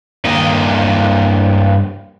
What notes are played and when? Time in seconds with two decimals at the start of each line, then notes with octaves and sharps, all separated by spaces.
0.25 G2 A#3 D#5